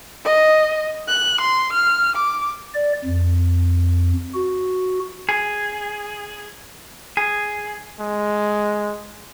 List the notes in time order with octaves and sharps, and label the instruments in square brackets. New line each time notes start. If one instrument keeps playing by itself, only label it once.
[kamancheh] D#5
F#6
C6
F6
D6
[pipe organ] D5
F2
F#4
[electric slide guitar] G#4
G#4
[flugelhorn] G#3